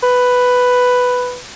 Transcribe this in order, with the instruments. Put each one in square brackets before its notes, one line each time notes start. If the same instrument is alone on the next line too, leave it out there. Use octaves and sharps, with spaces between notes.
[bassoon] B4